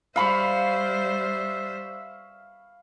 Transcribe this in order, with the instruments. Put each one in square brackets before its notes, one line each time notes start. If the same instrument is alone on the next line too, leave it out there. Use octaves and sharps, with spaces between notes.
[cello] G3 C5 [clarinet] E5 [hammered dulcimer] F5 B5 C#6